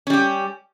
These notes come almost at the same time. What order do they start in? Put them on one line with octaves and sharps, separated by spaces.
C#4 G3 G4